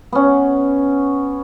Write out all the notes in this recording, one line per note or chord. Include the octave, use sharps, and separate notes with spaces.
B3 C#4